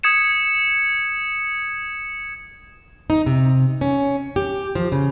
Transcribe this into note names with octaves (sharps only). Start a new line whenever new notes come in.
D#6 G#6 C#7 E7
D#4
C3
C#4
G4
F3
C#3